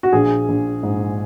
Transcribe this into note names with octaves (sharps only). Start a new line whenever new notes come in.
F#4
A#1 G#4
A#1
G#2